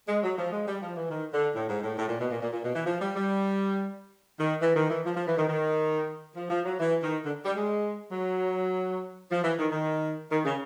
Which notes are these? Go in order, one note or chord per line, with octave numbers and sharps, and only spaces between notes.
G#3
F#3
F3
G#3
G3
F3
E3
D#3
D3
A2
G#2
A2
A2
A#2
B2
A#2
A#2
A#2
B2
E3
F3
G3
G3
D#3
E3
D#3
E3
F3
F3
E3
D#3
D#3
F3
F3
F#3
E3
D#3
D3
G3
G#3
F#3
F3
E3
D#3
D#3
D#3
C#3